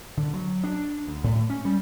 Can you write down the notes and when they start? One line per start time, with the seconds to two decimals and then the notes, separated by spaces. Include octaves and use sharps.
0.17 D3
0.33 F#3
0.64 D4
1.07 D2
1.24 A2
1.50 C#4
1.65 G3